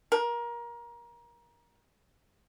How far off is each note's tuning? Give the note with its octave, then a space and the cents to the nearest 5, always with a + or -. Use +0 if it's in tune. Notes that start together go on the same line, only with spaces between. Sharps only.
A#4 +25